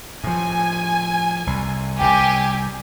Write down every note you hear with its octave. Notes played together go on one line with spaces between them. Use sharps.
A2 F3 G#5
C2
C2 C3 G4 G#5